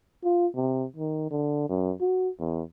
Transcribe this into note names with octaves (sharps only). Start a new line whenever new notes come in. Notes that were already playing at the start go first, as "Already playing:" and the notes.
F4
C3
D#3
D3
F#2
F#4
E2